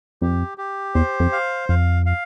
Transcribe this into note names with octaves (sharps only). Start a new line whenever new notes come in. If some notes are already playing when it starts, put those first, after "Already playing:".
F2 G4
G4
E2 C5
F2
F5
F2 F5
F5